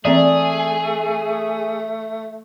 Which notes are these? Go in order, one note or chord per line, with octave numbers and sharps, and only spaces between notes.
E3 A3 A#3 C4 G#4 D5 E5 A#5